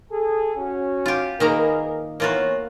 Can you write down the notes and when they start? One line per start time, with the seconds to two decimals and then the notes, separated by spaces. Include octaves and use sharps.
0.12 G#4 A4
0.57 C#4 F#4
1.06 F4 G4
1.40 D#3 A#3 G#4 A#4 B4 A#5
2.20 E3 A#3 B3 F4 F#4 C#5